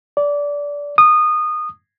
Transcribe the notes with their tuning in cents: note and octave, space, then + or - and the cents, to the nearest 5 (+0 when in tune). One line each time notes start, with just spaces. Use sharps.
D5 -20
D#6 -20